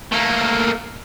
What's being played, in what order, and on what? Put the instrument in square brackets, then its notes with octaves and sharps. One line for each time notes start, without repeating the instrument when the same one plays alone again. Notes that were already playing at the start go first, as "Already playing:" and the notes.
[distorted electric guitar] A3 A#3